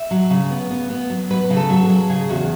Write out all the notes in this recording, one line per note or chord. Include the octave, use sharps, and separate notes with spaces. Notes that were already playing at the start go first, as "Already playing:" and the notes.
Already playing: E5
F#3
C#3
B3
B3
B3
F#3
F#3 B4
C#3
A4
F#3
G#4
F#3
C#3 G#4
E2 F#4